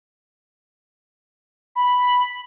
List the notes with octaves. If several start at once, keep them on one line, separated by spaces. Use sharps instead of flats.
B5